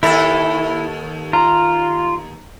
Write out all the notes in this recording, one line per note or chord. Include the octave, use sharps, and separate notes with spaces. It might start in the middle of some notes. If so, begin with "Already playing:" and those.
D#2 E4 A4
F4 A#5